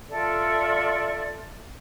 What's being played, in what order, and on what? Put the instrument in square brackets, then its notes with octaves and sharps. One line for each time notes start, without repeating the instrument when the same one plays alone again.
[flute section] F4 A4 D5 E5